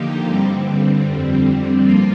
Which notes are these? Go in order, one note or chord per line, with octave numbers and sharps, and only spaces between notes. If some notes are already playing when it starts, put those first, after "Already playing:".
Already playing: D3 F3 A#3 D#4 G4
G2 D3 G3 C4
F2 D3 G3 C4
G2 F3 A#3 F4